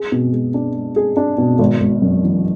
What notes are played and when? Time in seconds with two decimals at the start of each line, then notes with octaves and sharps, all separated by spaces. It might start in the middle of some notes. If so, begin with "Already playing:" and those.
Already playing: G#4
0.12 B2
0.33 G#3
0.54 D4
0.75 G#3
0.96 G#4
1.17 D4
1.38 B2
1.59 G#1
1.80 G#1
2.02 F#2
2.23 E3